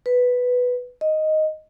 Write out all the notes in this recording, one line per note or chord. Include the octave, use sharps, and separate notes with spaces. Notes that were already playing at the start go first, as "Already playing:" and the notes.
B4
D#5